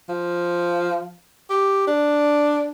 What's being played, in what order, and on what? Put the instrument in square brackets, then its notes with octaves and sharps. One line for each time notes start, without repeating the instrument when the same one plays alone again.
[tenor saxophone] F3
G4
D4